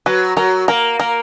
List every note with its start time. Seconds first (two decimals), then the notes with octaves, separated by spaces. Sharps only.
0.06 F#3 B4
0.36 F#3 A#4
0.68 A#3 A#4
1.00 A#3 A#4